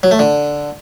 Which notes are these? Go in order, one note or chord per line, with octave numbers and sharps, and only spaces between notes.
F#3
A3
D3